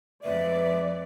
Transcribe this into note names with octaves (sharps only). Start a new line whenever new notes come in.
F2 G#3 B4 D5 E5